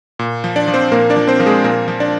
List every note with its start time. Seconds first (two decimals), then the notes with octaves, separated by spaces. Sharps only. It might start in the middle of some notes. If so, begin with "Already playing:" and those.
0.19 A#2
0.44 F3
0.56 D4 D5
0.68 F3
0.74 C4 C5
0.92 A#2 A#3 A#4
1.10 D4 D5
1.16 F3
1.27 C4 C5
1.40 F3 A#4
1.46 G#3 G#4
1.64 A#2 A#3 A#4
1.88 F3
2.00 D4 D5